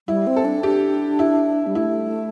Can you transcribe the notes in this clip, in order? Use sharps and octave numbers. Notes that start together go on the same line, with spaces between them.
G3 E4
C4
A4
D4
D4 G4
E4
G3
A3 E4